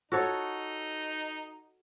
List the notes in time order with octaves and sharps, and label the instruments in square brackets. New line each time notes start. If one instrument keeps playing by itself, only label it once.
[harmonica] D#4 [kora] F#4 A4 C#5